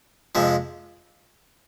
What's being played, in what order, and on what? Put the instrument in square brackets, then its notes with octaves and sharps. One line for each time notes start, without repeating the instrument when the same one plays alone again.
[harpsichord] F2 C3 F3 G#3